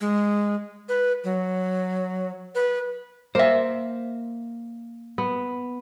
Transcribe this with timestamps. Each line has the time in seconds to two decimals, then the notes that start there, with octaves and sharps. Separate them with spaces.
0.01 G#3
0.89 B4
1.24 F#3
2.55 B4
3.35 A#3 C5 E5
5.18 B3